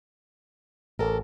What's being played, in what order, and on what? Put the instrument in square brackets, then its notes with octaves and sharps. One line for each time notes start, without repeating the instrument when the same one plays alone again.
[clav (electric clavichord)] A1 [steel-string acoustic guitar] A4 A#4